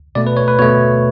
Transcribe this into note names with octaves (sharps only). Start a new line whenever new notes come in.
B2 A3 D5
B4
C#5
B4
B2 A3 C#5